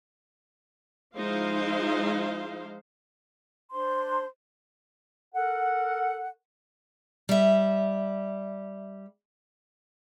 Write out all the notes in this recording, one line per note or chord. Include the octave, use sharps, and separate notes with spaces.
F3 G#3 D#4 E4 C5 F5
D4 C5 C6
A4 A#4 F#5
G3 E5